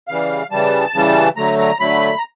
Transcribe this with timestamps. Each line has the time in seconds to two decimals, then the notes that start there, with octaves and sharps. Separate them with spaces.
0.08 C#3 E3 G3 F5
0.51 C#3 E3 G3 A5
0.94 C#3 E3 G3
1.37 D3 F#3 A3 A#5
1.59 A#5
1.80 D3 F#3 A3 B5
2.18 A#5